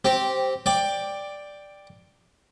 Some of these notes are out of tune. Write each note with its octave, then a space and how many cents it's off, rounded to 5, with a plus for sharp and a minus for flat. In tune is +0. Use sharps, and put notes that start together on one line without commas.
C4 +0 G4 -10
D5 +0 G5 +10